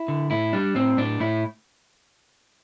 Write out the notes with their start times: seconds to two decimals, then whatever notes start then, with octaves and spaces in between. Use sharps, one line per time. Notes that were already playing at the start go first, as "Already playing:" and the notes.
Already playing: E4
0.08 D3
0.31 A2 E4
0.53 G3 D4
0.75 A2 C4
0.98 A2 D4
1.20 A2 E4